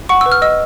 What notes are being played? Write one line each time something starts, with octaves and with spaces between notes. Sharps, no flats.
F#5 C#6
B4 E6
F6
D#5 E6